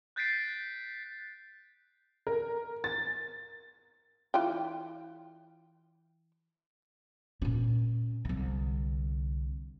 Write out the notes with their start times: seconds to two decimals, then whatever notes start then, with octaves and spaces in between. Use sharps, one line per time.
0.16 F#6 G6 A6 B6 C7 D7
2.27 A#4
2.84 A6
4.34 E3 F4 G5
7.42 A#2 C#4
8.25 C2 D3